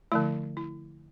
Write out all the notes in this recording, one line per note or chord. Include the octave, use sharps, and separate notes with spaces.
D3 F3 A3 E4
E4